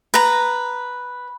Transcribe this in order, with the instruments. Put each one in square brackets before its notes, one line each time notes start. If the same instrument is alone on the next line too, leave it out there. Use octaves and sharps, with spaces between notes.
[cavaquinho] B4 A#5